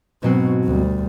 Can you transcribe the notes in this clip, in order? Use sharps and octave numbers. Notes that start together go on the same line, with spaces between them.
G#2 B2 F#3 C4
D2 G3